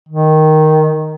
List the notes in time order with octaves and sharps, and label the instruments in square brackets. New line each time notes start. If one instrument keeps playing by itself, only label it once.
[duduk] D#3